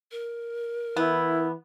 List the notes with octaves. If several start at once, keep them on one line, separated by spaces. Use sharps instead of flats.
A#4
E3 B3 E4